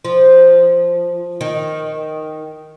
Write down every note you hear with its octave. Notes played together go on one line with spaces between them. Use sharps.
F3
D#3